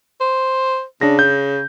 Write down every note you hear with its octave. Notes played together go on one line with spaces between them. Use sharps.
C5
C#3 D4 A#6
G6